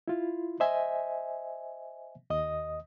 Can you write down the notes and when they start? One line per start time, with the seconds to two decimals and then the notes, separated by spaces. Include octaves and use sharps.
0.08 E4 F4
0.60 C5 D#5 E5 G#5
2.30 D#2 D#5 D#6